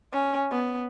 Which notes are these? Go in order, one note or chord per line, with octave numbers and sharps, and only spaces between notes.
C#4
B3